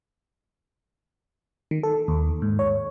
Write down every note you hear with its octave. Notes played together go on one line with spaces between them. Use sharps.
D#3
A4
D#2
G#2
C#5